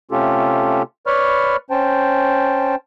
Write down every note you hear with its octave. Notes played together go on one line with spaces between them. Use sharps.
C3 A3 C#4 F4 G4 A4
B4 C#5 D5 B5 C#6 F6
C#4 C5 G5 A5